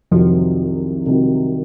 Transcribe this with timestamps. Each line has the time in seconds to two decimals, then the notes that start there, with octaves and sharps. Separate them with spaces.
0.11 C2 F2 C3 D#3 F3 F#3
1.06 C2 C3 D#3 F#3